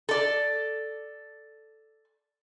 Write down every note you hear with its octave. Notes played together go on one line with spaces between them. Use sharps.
A4 D5